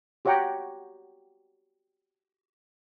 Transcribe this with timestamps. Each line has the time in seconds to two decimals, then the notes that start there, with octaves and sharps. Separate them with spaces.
0.25 F#4 G4 C#5 F#5 G5 A#5